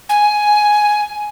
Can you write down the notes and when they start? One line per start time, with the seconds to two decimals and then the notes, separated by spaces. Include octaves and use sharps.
0.09 G#5